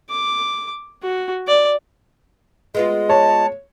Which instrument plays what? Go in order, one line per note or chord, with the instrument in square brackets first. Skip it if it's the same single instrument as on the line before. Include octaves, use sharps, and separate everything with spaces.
[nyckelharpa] D6
F#4
D5
[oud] G#3 B3 F4 [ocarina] D#5
[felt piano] C#5 [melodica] A5